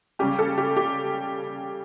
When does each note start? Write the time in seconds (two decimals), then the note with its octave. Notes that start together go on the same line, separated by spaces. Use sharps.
0.19 C#3 G3 C#4 G4
0.39 A4
0.58 G4
0.76 G4